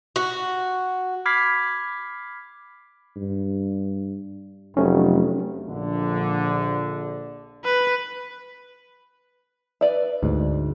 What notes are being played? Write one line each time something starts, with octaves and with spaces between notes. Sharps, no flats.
F#4
B5 D6 F6 G#6 B6 C7
G2
F1 F#3 A3 C4 C#4
A#1 D3
B4
B4 D5 E5
D2 G#2